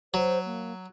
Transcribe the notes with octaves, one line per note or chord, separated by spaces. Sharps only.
F#3 C5
A#3